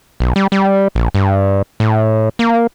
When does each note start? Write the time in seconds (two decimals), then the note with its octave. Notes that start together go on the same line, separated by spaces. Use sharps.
0.20 B1
0.36 G3
0.52 G3
0.95 A#1
1.15 G2
1.80 A2
2.39 A#3